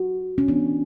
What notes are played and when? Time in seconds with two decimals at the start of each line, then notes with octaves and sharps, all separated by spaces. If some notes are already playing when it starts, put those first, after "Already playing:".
Already playing: F#4
0.38 C#4
0.48 E3 B3 D4